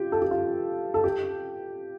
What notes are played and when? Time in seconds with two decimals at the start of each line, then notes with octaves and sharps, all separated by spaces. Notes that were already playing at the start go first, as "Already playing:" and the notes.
Already playing: F4 G4
0.12 A4
0.22 G4
0.31 F4
0.94 A4
1.04 G4